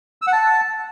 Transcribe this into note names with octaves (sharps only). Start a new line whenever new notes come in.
E6
F#5
A5